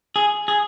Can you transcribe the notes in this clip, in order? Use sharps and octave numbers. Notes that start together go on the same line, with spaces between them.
G#4
G#4